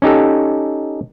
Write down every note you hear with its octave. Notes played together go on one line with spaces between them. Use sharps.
C#4 D#4 G4 A4